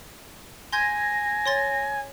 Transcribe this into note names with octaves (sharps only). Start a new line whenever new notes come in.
G#5 C6 G6 G#6 A#6
C#5 C6 A6